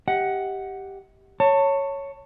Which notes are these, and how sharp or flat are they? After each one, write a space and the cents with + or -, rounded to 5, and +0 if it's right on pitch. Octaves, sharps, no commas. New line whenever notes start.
G4 +0 D#5 +40 F#5 +0
C#5 +0 A5 +30